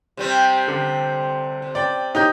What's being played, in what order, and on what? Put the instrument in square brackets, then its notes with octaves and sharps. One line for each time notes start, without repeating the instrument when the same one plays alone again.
[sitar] C3 G3 C4
[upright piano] D3
[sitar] C3
[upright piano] D5 G5
D#4 G4 G6